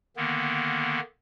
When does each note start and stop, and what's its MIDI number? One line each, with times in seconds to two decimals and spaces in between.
0.17 1.00 50
0.17 1.00 51
0.17 1.00 58
0.17 1.00 59